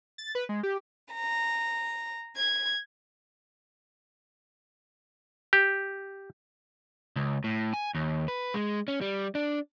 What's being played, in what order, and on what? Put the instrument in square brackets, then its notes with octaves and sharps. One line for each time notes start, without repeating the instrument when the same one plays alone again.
[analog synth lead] A6
B4
G#3
G4
[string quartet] A#5
G#6
[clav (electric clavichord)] G4
[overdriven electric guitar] C#2
A2
G#5
D#2
B4
G#3
C#4
G3
D4